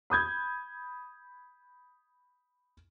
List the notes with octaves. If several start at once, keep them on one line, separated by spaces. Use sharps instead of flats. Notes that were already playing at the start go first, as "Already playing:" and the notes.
B5 D#6 G6 G#6